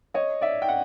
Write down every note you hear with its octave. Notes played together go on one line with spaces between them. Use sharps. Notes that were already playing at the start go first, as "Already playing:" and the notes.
C#5 D#5
D5 E5
G5
F#5